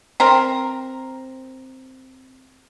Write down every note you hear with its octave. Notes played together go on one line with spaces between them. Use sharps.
C4 A#4